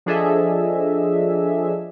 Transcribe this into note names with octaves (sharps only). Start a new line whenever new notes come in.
F3 D4 G#4 A4 D#5 E5